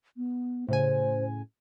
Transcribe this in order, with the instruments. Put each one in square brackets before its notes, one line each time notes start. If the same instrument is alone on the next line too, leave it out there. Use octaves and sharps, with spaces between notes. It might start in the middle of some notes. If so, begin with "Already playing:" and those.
[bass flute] B3
[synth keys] A2 C#3 G#5 [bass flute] C5